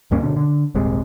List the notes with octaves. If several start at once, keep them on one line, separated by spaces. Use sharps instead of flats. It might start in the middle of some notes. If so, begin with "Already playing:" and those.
C#2 G2 A#3 C#4
B2 D3
D3
D#1 G#1 C3 G#3